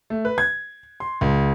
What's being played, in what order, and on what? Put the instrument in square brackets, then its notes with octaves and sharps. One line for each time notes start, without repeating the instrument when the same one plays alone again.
[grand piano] A3
B4
G#6
C6
C#2